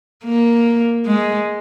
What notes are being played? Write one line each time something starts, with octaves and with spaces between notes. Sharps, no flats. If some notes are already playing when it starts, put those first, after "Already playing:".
A#3
G#3